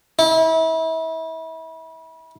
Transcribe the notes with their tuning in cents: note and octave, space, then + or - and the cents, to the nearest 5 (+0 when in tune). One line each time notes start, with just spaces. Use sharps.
E4 -35